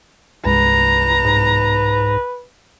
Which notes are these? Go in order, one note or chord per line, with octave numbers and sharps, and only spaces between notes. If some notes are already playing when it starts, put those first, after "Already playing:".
C2 G2 G#3 B4 A#5
G#2